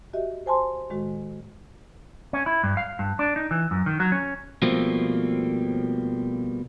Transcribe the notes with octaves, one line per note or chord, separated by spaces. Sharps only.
F#4 G4 D#5 E5
C5 G#5 A5 C6
A2 D#3 G#3 F#4
C#4
E4
G2
F5
G2
D4
D#4
E3
F#2
D#3
F#3
C#4
B2 F3 G3 A3 A#3 C4